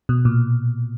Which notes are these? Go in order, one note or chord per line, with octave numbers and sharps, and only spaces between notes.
B2
A#2